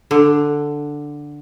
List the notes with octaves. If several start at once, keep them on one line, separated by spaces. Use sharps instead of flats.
D3